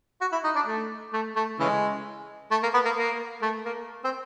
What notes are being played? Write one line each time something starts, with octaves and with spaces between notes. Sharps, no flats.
F#4
E4
D#4
D4
A3
A3
A3
C#3 E3 G#3
A3
A#3
B3
A#3
A#3
A3
A#3
C4